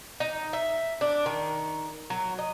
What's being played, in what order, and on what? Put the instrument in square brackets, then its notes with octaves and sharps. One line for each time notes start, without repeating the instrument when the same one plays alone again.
[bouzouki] D#4
E5
D4
D#3
F#3
D#5